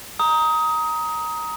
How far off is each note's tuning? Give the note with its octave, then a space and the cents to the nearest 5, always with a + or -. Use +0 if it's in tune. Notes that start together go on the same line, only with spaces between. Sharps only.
A#5 +0 D#6 +20